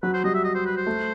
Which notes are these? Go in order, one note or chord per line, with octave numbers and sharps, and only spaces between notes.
F#3 B4
C5
G3 D#5
E5
D#5
C5
B4
C5
A3